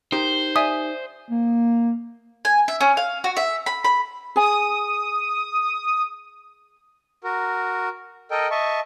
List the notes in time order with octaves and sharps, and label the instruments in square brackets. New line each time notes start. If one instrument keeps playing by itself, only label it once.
[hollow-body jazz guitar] D#4 G4 A#4 [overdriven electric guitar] C5
[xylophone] D5 E5 G#5 [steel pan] D#6
[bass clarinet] A#3
[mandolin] G#5
E5
C#4
F5
F#4
E5
B5
B5
[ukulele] G#4 G#5 [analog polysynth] D#6
[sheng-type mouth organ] F#4 A#4
A4 A#4 D#5 G5
D#5 E5 A5 C#6